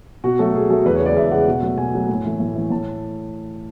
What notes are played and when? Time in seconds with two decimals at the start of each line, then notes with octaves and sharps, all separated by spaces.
0.24 B2 F#4
0.39 F#3 A3 A4
0.54 B2 G#4
0.69 F#3 A3 A4
0.86 E2 B4
0.95 C#5
1.01 C#3 G#3 D5
1.16 E2 E5
1.32 C#3 G#3 F#5
1.48 B2
1.63 F#3 A3
1.78 B2 G#5
1.94 F#3 A3
2.10 A2
2.25 E3 A3
2.40 A2
2.56 E3 A3
2.70 A2 A5